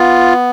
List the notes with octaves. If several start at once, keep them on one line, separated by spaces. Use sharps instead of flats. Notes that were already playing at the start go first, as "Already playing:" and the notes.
Already playing: B3 F4